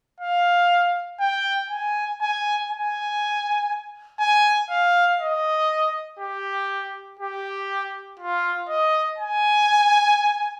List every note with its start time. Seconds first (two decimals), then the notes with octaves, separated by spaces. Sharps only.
0.20 F5
1.21 G5
1.71 G#5
2.21 G#5
2.71 G#5
4.20 G#5
4.71 F5
5.20 D#5
6.19 G4
7.20 G4
8.20 F4
8.69 D#5
9.18 G#5